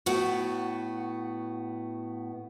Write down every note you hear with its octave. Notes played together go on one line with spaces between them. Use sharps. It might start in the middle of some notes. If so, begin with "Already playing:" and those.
A2 B3 F#4